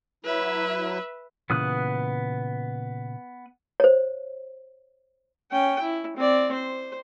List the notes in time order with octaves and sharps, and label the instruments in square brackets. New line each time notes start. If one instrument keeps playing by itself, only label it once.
[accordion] F#3 E4 [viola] B4 E5
[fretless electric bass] A#2 C#3 E3 [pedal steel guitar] B3 D#6 F#6
[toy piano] C5 C#5
[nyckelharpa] C#4 G5
E4
C4 D5
C5